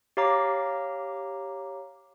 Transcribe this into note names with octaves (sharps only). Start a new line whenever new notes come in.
G4 C#5 F5 A#5 D6